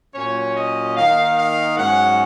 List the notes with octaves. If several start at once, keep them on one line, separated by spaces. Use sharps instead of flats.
A#2 F#3 C#4 C#5
D#5
D#3 A#3 D#4 F5
F5
G#2 F#3 C#4 F#5